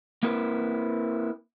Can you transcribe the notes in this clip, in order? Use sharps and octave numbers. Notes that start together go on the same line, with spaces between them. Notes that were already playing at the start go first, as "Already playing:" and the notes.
A#3 C4 E4 A#4 B4